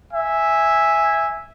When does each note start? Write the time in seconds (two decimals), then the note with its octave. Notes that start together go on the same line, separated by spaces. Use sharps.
0.14 E5 G#5